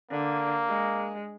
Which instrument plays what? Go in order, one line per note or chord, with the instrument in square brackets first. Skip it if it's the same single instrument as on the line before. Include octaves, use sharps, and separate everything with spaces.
[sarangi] D3 [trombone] A#3
[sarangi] G#3